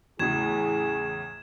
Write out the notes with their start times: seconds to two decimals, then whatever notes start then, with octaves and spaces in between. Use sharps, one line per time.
0.19 E2 A2 C#3 E4 G#4 G#6 E7